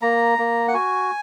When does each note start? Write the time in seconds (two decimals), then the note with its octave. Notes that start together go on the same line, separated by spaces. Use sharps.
0.02 A#3 A#5
0.38 A#3
0.68 F#5
0.73 F#4 G#5